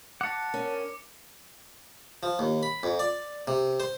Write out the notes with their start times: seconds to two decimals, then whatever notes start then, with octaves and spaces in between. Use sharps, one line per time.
0.21 F#5 A5 D6 C#7
0.54 C#4 A#4
2.23 F3
2.39 D#2
2.63 B5
2.83 F2
2.99 D5
3.48 C3
3.80 C5